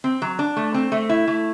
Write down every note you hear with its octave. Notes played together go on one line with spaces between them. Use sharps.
C4
F#3
D4
A3
C4
A3
E4
A3